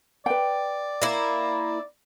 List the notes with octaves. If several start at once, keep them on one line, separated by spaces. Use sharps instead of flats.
B4 D5 G5
A#3 E4